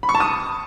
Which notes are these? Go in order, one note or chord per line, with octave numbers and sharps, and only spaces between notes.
B5
C#6
A5
D#6